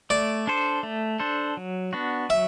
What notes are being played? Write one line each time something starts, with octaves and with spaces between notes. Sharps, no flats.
A3 D5
D4 A4 C5
A3
D4 A4 C5
F#3
B3 D4 F#4
F#3 E5